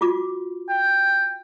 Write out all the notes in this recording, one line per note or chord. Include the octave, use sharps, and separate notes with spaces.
F4 F#4 D6
G5